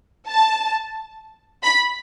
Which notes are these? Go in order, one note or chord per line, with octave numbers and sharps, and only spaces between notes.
A5
B5